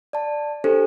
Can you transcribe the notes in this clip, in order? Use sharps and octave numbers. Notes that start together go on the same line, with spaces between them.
D5 A5
D4 G4 A4 C5